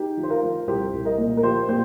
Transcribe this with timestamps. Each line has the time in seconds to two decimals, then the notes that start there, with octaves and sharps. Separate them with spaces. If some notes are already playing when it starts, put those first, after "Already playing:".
Already playing: D#4 G4
0.17 F3
0.23 C5
0.30 F4 A#4
0.43 F3
0.67 C2 G4 C5
0.93 C2
1.05 A#4 D#5
1.18 A#2
1.37 A#4
1.43 F3 G4 C5
1.68 A#2 G4 C5